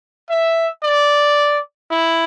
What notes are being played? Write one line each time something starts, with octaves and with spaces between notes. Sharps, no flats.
E5
D5
E4